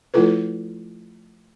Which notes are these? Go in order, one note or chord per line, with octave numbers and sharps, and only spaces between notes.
F3 A3 E4 F4 A4 B4